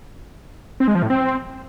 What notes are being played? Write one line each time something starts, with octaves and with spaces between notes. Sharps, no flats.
C4
G#3
F3
A2
C4